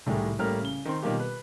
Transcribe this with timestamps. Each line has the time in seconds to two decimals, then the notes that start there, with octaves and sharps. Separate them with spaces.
0.06 C2 A2 D#3 G3 G#3
0.39 A1 G3 A3 A#3 A#5 F6
0.61 C#3 G7
0.85 D#3 C4 C6
1.02 B2 D#3 G3 A#3 F4 G4
1.20 B4